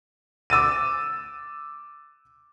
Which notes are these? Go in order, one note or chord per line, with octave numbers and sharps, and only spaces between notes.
D6 E6 A6 D#7